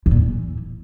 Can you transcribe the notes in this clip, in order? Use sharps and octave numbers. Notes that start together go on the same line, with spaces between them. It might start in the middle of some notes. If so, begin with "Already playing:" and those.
E2
A#2
E3